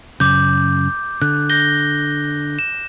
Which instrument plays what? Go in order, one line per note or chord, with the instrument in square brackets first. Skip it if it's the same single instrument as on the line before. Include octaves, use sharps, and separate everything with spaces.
[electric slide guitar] F#2 C#3 [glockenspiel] D6 G6
[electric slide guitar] D3 [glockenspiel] F#6
[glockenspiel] G6 A#6 G7
E7